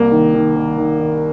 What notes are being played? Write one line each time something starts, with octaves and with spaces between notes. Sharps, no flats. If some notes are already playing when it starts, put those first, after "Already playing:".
Already playing: C2 A#3
D#3
D#3
D#3
D#3
D#3